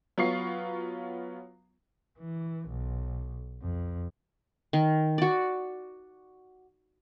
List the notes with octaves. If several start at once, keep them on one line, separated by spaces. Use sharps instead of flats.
F#3 B3 F4 C#6 C7
E3
B1
F2
D#3
F#4 D5